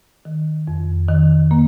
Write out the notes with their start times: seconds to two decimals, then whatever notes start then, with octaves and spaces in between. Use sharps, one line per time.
0.25 D#3
0.67 F2
1.09 D#3
1.51 A#3